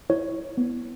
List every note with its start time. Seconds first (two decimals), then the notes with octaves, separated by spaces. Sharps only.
0.10 E4 C#5
0.57 B3